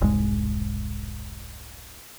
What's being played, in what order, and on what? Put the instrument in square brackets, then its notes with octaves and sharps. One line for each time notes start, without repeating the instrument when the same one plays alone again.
[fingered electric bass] E1 C2 G#2 G#3